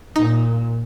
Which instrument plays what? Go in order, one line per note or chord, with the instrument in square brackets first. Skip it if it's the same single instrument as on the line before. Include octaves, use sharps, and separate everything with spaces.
[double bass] A#2 [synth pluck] D#4